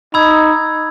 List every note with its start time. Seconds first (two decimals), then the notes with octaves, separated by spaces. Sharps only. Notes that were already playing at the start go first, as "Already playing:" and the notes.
0.14 D#4 B5 E6 G#6